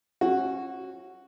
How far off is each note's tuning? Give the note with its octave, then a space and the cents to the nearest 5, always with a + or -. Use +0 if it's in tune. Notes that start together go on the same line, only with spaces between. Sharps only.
C#4 -30 F#4 +0